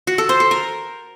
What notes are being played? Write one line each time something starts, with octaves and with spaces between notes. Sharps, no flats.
F#4
A4
C5
A4
A#4